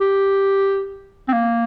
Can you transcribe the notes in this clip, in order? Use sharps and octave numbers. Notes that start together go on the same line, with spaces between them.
G4
C4
A#3